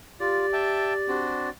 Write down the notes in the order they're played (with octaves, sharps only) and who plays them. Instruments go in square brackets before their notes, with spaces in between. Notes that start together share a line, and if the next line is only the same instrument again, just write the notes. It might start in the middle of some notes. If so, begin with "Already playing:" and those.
[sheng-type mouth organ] F4 [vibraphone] G4 [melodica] D5
[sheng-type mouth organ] E5 G5 A5
C4 D4 F#4